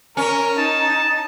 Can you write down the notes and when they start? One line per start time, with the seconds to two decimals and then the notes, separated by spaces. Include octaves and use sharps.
0.17 C#4 A#4
0.58 D#4 A5